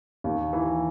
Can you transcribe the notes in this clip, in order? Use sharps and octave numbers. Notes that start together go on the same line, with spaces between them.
D#2
E3